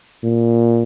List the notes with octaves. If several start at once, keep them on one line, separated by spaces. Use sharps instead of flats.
A#2